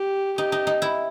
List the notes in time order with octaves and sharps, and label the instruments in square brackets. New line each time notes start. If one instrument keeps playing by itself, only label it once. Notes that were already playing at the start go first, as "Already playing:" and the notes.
Already playing: [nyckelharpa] G4
[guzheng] D#4 [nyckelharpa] G4
[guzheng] D#4
D#4
E4